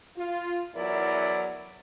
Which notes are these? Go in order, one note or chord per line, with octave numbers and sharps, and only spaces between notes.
F4
E2 F#3 E4 A#4 D5